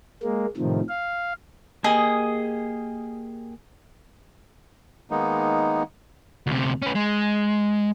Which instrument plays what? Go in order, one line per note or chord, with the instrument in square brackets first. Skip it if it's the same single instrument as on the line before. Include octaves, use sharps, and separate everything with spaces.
[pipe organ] G#3 A#3
A2 C3 D#3 F3
F5
[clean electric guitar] A#3 G4 D#5 [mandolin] G#4
[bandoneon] D#3 G#3 A#3 B3 D#4
[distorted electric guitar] D2 C3
C#4 B4
G#3